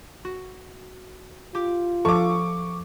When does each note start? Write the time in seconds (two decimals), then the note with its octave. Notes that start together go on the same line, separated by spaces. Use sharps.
0.25 F#4
1.55 F4 G4 D6
2.05 F3 A4 F5 C#6 D6